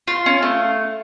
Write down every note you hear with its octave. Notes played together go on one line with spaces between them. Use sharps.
F4
C#4
A3